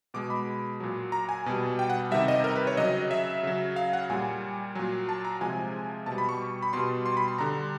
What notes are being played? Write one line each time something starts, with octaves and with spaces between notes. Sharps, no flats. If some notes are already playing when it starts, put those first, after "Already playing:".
B2 G#3 D6
B5
A#2 F#3
A#5
G#5
B2 G3
G5
F#5
C3 D#3 G3 E5
D#5
A#4
B4
C#5
C#3 F#3 D#5
E5
C#3 F#3
F5
F#5
A#2 G3 G#5
A#2 F#3
A5
A#5
C3 F3 G#3 G#5
B2 A5
G3
B5
C#6
B5
B2 G3 C6
C6
B5
C6
D3 G3 A#5